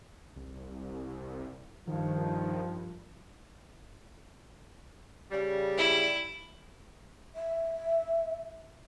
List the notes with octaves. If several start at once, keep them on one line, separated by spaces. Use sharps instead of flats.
C2
G2 D#3 F3
C#3 G3
E4
E5